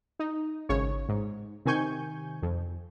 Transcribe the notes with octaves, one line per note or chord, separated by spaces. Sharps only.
D#4
G#1 C#3 C#5
G#2
C3 D#3 G#5 C#6 G6
F2